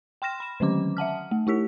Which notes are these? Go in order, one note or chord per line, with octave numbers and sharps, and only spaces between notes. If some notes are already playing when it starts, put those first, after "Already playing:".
G5 C6 F6 A#6 E7
B5 E7
D3 D#3 F#3 C#4 D6
E5 F#5 A5 F6
A3
A3 E4 G4 B6